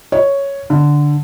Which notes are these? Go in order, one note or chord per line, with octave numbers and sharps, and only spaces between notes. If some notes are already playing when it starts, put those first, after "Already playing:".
C#5
D3